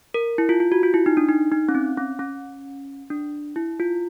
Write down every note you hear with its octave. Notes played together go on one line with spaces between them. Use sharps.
A#4
E4
F4
F4
F#4
F4
E4
D#4
D4
D#4
D#4
C#4
C4
C#4
C#4
D4
E4
F4